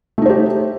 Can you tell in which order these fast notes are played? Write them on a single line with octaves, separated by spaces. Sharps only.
A3 D#4 C5 G4